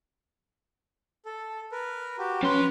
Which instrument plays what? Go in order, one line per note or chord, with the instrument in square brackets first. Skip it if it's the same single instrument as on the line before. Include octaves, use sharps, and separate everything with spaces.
[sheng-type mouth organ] A4
A#4 B4
F#4 G4
[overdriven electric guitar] F3 C6 [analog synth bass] C#4 [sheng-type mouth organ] B4